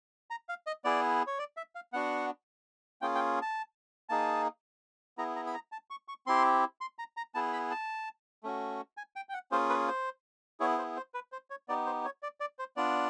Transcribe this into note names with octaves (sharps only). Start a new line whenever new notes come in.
A#5
F5
D#5
B3 E4 G#4 D5
C#5
D5
E5
F5
B3 D4 F#4 F#5
A#3 C#4 F4 G#4 G5
G5
A5
A#3 D#4 G#4 A5
B3 E4 G#4 A#5
A#5
B5
A#5
A5
C#6
C#6
C4 E4 G4 C6
C6
A#5
A#5
B3 E4 G#4 A5
B5
A5
A3 C#4 F#4
G#5
G5
G5
F#5
A#3 C#4 F4 G#4 C5
B4
C5
B3 E4 G#4 C#5
C5
C5
B4
C5
C#5
B3 D#4 G4 D5
C5
C#5
D5
D5
C5
B3 D4 F4 D5